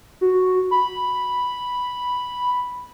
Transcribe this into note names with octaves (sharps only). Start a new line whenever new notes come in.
F#4
B5